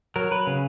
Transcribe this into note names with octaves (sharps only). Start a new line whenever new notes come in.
F#3 A#4
F#3 B4
C#3